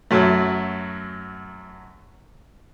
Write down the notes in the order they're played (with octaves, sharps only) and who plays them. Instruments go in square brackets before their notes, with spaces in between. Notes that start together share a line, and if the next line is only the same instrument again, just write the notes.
[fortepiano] F#2 F#3 A3